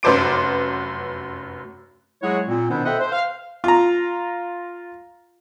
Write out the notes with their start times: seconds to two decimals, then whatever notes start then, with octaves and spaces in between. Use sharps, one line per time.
0.03 F1 F#2 B4 C5 D6 D7
2.22 F#3 G#3 E4 G#4 C#5 F#5
2.47 A#2 C4
2.70 B2 D#3 B3 D4 E4 C5
2.85 A4 C5 D#5 E5 F#5 G5
3.00 C5
3.13 F5
3.64 F4 A#5